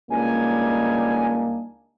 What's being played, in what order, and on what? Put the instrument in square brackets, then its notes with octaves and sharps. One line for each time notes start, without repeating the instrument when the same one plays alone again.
[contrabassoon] C#2 [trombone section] G3 D4 D#4 [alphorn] A#3 [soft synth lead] G#5